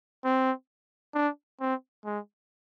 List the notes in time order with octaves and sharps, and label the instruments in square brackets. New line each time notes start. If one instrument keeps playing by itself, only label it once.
[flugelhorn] C4
D4
C4
G#3